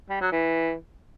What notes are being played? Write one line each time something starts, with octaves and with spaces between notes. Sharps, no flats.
G3
F#3
E3